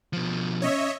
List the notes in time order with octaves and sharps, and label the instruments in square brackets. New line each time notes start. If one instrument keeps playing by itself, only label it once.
[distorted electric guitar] B2 F3
[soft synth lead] C#4 [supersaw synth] C#5 D#5 E5